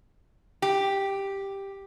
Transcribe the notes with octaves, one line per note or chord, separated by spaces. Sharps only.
G4